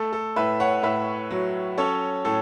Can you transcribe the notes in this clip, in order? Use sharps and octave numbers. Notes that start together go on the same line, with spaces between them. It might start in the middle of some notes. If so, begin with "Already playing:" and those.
Already playing: A3 A4
A4
A2 B4 E5
C#5 F#5
A2 B4 E5
F#3
C#4 A4 C#5
A2 A4